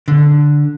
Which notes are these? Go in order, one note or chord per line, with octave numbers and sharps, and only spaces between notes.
D3